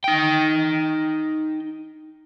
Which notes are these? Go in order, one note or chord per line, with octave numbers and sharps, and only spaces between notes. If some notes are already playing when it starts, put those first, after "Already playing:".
D#4 G5